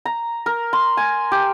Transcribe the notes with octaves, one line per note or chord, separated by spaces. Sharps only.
A#5
A#4
C6
G#5
G4